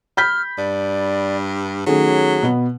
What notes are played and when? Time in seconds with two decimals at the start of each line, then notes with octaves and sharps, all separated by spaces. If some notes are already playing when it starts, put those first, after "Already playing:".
0.17 B5 F6 G6 B6
0.58 G2 D5
1.86 D#3 F#3 A3 C#4 G#4
2.43 B2 B3